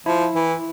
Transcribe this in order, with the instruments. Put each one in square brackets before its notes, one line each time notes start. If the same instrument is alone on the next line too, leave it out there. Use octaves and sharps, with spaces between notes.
[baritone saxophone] F3 [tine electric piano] E4
[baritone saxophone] E3